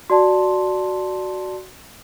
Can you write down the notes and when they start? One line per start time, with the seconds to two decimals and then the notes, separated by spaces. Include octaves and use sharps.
0.10 F#4 D5 A5 C6